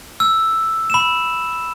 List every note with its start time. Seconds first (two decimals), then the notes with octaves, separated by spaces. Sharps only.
0.20 E6
0.90 B5 E7